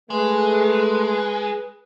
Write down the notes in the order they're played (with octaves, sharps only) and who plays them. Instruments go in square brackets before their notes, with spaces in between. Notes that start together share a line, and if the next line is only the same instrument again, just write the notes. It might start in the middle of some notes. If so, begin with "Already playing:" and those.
[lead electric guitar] G#3 [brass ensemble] A3 [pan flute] G#4 [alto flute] B4